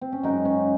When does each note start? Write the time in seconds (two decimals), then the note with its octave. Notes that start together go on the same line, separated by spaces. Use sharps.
0.01 C4
0.12 C#4
0.23 F#2 C#3 G#3 D#4
0.45 C#4